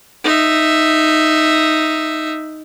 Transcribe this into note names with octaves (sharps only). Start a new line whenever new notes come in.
D#4 E5